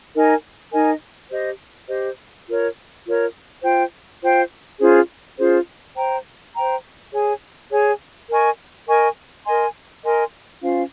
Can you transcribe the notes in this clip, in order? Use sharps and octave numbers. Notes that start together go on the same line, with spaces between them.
D#4 A#4 D#5 G#5
D#4 A#4 D#5 G#5
G4 C5 D#5
G4 C5 D#5
F4 A#4 C#5
F4 A#4 C#5
F4 C5 G5
F4 C5 G5
C#4 F4 G#4 C5
C#4 F4 G#4 C5
C5 G5 A#5
C5 G5 A#5
G#4 C#5 G#5
G#4 C#5 G#5
A#4 D#5 G#5 C#6
A#4 D#5 G#5 C#6
A#4 D#5 G#5 C6
A#4 D#5 G#5 C6
C#4 F4 C5 F5